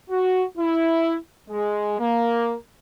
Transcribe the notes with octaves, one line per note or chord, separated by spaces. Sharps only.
F#4
E4
G#3
A#3